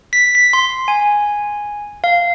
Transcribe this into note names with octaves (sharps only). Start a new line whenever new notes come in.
B6
B6
C6
G#5
F5